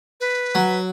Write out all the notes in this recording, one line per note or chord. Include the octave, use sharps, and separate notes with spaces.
B4
F#3